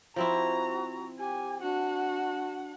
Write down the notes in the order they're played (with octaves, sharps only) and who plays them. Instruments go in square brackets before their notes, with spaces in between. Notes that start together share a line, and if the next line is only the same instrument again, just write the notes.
[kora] F3 C4 E4 [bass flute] F#4 [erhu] A#5
[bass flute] G4 [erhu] G#5
[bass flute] D4 [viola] F#4 [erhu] F#5